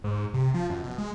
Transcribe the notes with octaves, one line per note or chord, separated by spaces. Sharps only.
G#2
C3
F3
F#2
B2
G#3